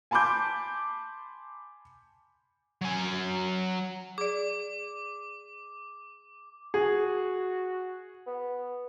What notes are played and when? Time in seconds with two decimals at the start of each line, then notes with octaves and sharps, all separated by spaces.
0.11 G#5 A5 B5 C6 D6 G6
2.82 F#3 G#5
4.18 G#4 D5 D6
6.74 F#4 G#4
8.27 B3